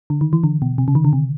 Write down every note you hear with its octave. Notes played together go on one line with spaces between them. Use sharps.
D3
D#3
E3
D3
B2
C3
C#3
D#3
D3
C3